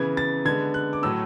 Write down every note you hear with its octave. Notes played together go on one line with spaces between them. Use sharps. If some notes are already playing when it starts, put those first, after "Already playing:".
Already playing: C#3 E3 B3 G#6
A6
D3 G#3 B3 G#6
F#6
D6
A2 F#3 A3 E6